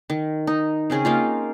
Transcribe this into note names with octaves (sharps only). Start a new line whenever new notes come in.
D#3
D#4
C#3 C4 C#4 G#4
A#3 D#4 F4